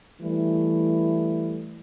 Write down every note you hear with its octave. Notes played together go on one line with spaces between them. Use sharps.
E3 G3 A3 E4